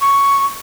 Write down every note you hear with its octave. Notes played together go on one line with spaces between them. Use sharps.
C#6